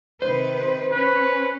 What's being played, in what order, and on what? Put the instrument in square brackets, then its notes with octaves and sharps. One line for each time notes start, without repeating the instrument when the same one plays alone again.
[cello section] C3 D#3 B4 [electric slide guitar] C5
[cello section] C#4 [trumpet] B4